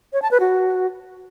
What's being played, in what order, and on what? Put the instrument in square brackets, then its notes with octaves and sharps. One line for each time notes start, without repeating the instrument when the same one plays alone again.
[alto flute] C#5
A5
B4
F#4